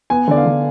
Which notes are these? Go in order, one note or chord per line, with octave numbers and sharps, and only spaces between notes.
B3 G#5
D3 D5
F5
D3